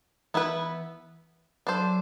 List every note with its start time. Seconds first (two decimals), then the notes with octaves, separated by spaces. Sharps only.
0.34 E3 B3 E4 B4
1.67 F#3 D4 A4 C5